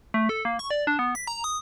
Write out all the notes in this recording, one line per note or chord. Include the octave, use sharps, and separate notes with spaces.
A3
A4
A#3
C#6
D5
D4
B3
B6
A#5
D#6